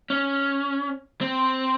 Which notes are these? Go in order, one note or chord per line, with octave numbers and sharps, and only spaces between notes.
C#4
C4